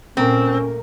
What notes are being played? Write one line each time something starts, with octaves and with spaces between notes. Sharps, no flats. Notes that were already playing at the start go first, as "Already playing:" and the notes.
A#2 A3 C4 C#4 A#4